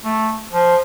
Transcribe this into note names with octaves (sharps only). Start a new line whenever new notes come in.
A3
F3